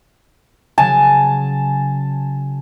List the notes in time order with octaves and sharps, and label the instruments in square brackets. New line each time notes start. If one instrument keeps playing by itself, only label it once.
[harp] C#3 F#3 [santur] G#5 A5